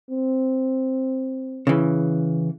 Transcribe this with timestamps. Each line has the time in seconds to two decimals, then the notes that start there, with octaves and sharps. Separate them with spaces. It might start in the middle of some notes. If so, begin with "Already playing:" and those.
0.10 C4
1.67 C#3 E3